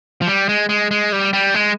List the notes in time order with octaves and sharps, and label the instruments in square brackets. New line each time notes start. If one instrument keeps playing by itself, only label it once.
[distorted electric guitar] F3
G3
G#3
G#3
G#3
G3
G3
G#3